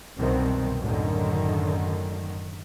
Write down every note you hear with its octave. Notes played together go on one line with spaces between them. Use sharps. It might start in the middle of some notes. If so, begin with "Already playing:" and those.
C2 F#2 B2 D#3 C4
F#2 A2 D3 D#3